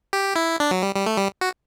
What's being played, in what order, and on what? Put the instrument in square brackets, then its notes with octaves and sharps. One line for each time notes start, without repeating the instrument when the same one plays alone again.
[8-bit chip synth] G4
E4
D4
F#3
G3
G3
A3
G3
F#4